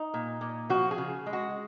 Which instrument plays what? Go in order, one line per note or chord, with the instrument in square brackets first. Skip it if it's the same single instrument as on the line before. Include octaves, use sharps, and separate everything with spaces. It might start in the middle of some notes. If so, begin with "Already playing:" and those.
Already playing: [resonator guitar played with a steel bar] D#4
A#2
A#2
F3 F#4
G#4
C#3
G#3
F#4